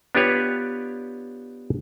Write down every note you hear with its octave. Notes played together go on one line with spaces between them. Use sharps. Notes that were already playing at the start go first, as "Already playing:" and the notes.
B3 D4 F4 G4 B4 C#5